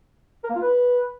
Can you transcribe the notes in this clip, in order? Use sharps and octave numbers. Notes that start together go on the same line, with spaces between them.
A#4
A#3
F4
B4